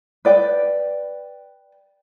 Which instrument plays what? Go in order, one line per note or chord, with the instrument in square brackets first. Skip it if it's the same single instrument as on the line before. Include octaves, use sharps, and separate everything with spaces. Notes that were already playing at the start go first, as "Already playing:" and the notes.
[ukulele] B4 D5 G5